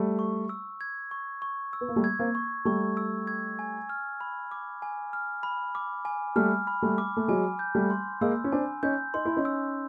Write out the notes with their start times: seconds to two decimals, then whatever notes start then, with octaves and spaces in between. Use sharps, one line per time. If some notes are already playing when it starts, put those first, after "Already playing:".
Already playing: G3 A3
0.19 C#6
0.49 E6
0.81 G#6
1.11 C#6
1.42 C#6
1.73 E6
1.81 B3
1.89 A#3
1.96 G3 A3
2.04 G#6
2.19 A#3 C4
2.35 C#6
2.65 G3 A3 C#6
2.97 E6
3.27 G#6
3.59 G#5
3.89 F6
4.21 B5
4.51 D6
4.82 G#5
5.13 F6
5.43 B5
5.75 D6
6.05 G#5
6.36 G3 A3 F6
6.67 B5
6.82 G3 A3
6.98 D6
7.17 A3
7.28 F#3 G#3 G#5
7.59 G6
7.75 G3 A3
7.90 C6
8.21 G#3 A#3 E6
8.44 C#4
8.52 C4 D4 G#5
8.83 C#4 D#4 G6
9.14 D#4 C6
9.25 E4
9.37 C#4 D#4
9.45 E6